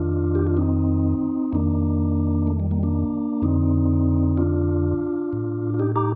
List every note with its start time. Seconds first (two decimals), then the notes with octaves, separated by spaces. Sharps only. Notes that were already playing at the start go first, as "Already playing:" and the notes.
Already playing: F2 D#3 D4 F4
0.35 G4
0.47 F4
0.57 C4 D#4
1.52 F2 D#3 A#3 D4
2.47 A3
2.60 G3
2.71 G3 A#3
2.83 A#3 D4
3.42 F2 D3 C4 D#4
4.37 D4 F4
5.33 A2
5.74 F4
5.79 D#4 G4
5.96 D#4 G4